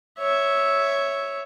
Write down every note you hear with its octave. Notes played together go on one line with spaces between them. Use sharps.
C#5 E5